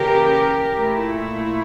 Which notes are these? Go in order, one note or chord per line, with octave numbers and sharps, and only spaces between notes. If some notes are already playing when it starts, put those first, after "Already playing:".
Already playing: C#3 E3 A#3 C#4 G4 A#4
A#2 A3 E4